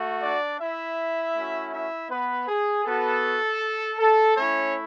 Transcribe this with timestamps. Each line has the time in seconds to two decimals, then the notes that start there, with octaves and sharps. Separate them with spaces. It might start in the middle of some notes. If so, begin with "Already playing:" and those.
Already playing: A3 F#4
0.22 D4 D5
0.60 E4 E5
1.36 A3 C#4 F#4
1.73 E4 E5
2.10 B3 B4
2.48 G#4
2.85 B3 F#4 A4
3.98 A4
4.36 A3 C#4 E4 C#5